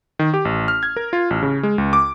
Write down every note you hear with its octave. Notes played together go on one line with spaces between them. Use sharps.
D#3
G4
A1
F6
G#6
A#4
F4
A1
C#3
G#3
C#2
D6